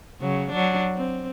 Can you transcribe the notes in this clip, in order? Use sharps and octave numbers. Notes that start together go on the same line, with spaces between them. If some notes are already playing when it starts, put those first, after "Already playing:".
C#3 F#3
F#3 D4
C4